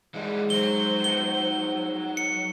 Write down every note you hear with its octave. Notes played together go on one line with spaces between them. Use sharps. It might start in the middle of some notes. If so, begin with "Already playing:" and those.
G#2 E3 G3 G#3 F#5
F#3 C5 G7
F3 B3 D#4 G7
C#7